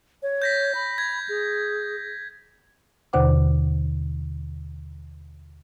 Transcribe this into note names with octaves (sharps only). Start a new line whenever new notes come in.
C#5
G6 A#6 B6
B5
G#6
G#4
D#2 B2 D3 C5 F#5 D6